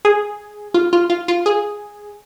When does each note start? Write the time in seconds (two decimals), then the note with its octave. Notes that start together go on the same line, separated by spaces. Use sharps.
0.05 G#4
0.74 F4
0.93 F4
1.10 F4
1.28 F4
1.46 G#4